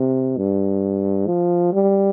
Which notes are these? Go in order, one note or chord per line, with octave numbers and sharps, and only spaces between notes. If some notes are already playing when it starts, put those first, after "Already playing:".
Already playing: C3
G2
F3
G3